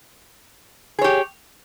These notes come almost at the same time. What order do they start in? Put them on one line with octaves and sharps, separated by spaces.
G#4 C#5 G4